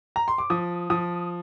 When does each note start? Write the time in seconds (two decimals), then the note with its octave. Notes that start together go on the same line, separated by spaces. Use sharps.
0.16 A#5
0.28 C6
0.38 D6
0.50 F3 D#6
0.90 F3 D#6